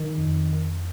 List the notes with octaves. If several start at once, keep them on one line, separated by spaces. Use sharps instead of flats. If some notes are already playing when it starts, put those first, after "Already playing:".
Already playing: D#3
F2